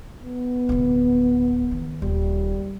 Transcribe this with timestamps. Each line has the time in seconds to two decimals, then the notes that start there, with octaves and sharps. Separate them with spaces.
0.24 B3
0.69 D1 D2
1.71 D#3
2.02 D#1 G3